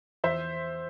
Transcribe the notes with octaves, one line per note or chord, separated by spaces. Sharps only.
E2 C5 E5